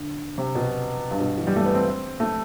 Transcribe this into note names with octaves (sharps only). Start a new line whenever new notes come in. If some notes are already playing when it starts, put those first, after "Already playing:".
Already playing: D3
C3
B2
G2
B2
E3
G3
A3
B3
C4
A3